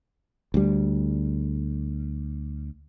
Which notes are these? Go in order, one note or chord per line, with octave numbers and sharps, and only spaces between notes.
D2 G3